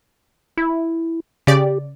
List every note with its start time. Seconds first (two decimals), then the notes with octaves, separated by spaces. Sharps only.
0.57 E4
1.47 C#3 G4 D5